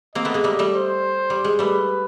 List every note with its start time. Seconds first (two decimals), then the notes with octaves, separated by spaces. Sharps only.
0.15 A#3 C4 D#5
0.25 A3 B3
0.34 G#3 A#3
0.44 G3 A3
0.59 G3 A3
0.73 C5
1.30 G3
1.44 G#3
1.59 G3 A3 B4